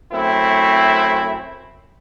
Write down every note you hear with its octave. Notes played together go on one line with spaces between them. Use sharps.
F#2 A3 C4 E4